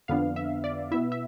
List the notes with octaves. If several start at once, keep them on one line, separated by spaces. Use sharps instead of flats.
F2 D3 F3 B3 D4 F5
E5
D5
B2 B3 E4 E5
E5